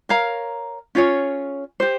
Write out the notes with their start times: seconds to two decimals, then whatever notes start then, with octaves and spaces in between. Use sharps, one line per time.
0.09 A#4 C#5 F5 A#5
0.95 C#4 F4 G#4 C#5
1.80 G4 C5